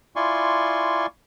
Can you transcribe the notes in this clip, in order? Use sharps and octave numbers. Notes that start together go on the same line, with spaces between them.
E4 F4 D5 G#5 C6 C#6